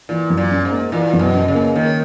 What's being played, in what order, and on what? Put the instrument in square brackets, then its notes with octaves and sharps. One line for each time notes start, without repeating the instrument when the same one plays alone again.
[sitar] A#2 [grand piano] E3
[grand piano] F#2
[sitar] A#2
[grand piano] C#4
[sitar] G#2
[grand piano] A#3
[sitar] A#2 [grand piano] E3
[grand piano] F#2
[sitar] B2
[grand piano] C#4
[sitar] C#3
[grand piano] A#3
[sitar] D#3 [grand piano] A#3